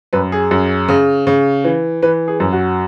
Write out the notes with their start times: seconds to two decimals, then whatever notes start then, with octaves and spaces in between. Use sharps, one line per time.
0.13 F#2 B4
0.32 G#4
0.51 F#2
0.89 C#3
1.27 C#3
1.64 E3
2.02 E3 B4
2.28 G#4
2.40 F#2
2.53 F#4